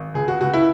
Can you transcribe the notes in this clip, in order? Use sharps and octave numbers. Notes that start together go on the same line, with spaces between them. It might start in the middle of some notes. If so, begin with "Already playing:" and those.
Already playing: G#1
C#2 G#4
F#4
C#2 F#4
E4